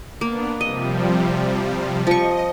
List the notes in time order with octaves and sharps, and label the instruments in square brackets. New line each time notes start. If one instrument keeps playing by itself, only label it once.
[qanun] A#3 [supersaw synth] B3 D4
[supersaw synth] C3 F3 G3 [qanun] D#5
[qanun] F3 C#6 [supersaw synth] D#5